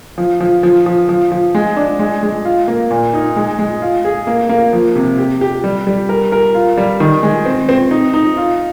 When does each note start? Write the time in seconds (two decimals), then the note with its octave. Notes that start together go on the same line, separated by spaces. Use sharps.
0.18 F3
0.40 F3
0.63 F3
0.86 F3
1.09 F3
1.31 F3
1.55 G#3
1.77 D4
1.99 G#3
2.23 G#3
2.45 F4
2.68 A#3
2.91 A#2
3.14 D#4
3.36 G#3
3.59 G#3
3.82 F4
4.05 G#4
4.27 A#3
4.49 A#3
4.73 F3
4.95 C3
5.18 G4
5.41 G4
5.64 G3
5.87 G3
6.09 A#4
6.32 A#4
6.55 F4
6.77 G3
7.00 D#3
7.23 G#3
7.46 C4
7.69 C4
7.91 D#4
8.14 D#4
8.37 F4